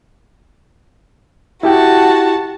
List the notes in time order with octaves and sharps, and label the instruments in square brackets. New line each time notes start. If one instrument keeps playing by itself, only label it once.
[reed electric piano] E4 G4 G5 [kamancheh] F#4 A5